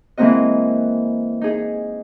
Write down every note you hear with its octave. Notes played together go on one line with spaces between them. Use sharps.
E3 G#3 A#3 C4 F#4 D#5
D#4 G#4